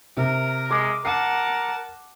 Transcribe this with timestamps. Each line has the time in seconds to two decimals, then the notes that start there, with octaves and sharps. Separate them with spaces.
0.17 C3 A#4
0.71 G#3 D6
1.05 A#4 F#5 A5 C7